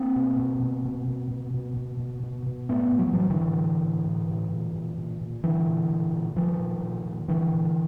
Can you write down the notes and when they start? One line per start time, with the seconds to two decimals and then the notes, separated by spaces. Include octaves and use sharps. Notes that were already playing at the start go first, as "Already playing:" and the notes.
Already playing: A#3 C4
0.16 B2
0.39 B2
0.63 B2
0.85 B2
1.08 B2
1.31 B2
1.54 B2
1.77 B2
2.00 B2
2.23 B2
2.46 B2
2.68 A2 A3 B3
2.92 A2
2.99 F#3
3.07 F3
3.13 A2 E3 F#3
3.30 D3 E3
3.37 A2
3.60 A2
3.83 A2
4.06 A2
4.30 A2
4.53 A#2
4.76 A#2
4.98 A#2
5.21 A#2
5.44 A#2 D3 E3
5.67 A#2
5.90 A#2
6.13 A#2
6.35 A#2 D#3 F3
6.59 A#2
6.82 A#2
7.06 A#2
7.27 A#2 D3 E3
7.51 A#2